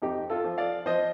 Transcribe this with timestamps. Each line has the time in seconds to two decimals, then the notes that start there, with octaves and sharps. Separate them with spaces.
0.02 F2 D#4 G4
0.30 F4 A4
0.44 F3
0.58 D5 F5
0.86 F3 C5 D#5